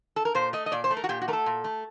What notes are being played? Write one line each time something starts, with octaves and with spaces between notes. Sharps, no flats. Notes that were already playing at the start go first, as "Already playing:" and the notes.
A4
A#4
A#2 C5
A3 D#5
D#5
A#2 D5
C5
A3
A#4
F#4
A#2 G4
F#4
A3 A#4
A4
A#2
A3